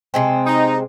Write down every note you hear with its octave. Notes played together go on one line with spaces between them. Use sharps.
C3 G#3 C4
D#4